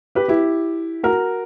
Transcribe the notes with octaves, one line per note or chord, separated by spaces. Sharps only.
G4 B4
E4 G4
F#4 A#4